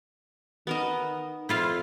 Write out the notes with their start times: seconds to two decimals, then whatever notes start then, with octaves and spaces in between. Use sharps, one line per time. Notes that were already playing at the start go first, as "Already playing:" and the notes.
0.67 D#3 B3 A#4 D#5
1.49 F2 E4 F4 F5